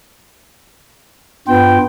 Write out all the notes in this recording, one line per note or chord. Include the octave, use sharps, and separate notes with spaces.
G2 B3 F4 G5